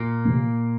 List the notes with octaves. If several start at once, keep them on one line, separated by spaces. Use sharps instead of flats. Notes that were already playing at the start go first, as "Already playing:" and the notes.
Already playing: A#2 A#3
C3 E3 A3